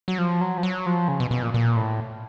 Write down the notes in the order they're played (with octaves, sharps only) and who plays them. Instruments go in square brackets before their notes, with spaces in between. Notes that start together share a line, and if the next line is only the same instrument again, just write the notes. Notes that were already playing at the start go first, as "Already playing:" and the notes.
[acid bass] F#3
F3
F#3
F3
F#3
F3
C#3
B2
B2
A#2
A#2
A2